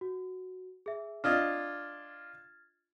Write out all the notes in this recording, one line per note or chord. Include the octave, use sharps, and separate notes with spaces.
F#4
G#4 E5
D4 F4 D#5 F6 G#6 A6